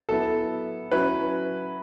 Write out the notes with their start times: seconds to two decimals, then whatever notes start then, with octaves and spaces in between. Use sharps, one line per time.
0.09 F#3 B3 E4 A4
0.91 F#3 C#4 E4 B4